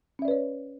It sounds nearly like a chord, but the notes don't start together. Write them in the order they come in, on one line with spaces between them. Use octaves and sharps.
C#4 E5 D5 B4 C#5